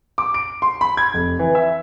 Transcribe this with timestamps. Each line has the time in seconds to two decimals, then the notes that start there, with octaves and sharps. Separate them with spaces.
0.18 D6
0.34 D7
0.62 C6
0.81 B5
0.97 G#6
1.14 F1
1.39 E3
1.55 E5